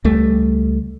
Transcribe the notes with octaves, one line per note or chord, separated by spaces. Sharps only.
C#2 G3 A3